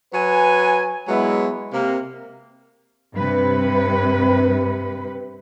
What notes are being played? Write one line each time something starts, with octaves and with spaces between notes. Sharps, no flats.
F#3 B4 G#5
F#3 G#3 B3 E4
C3 A#3
G2 C3 B4